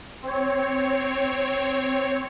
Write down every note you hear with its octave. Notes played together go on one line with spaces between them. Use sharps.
C4 C#5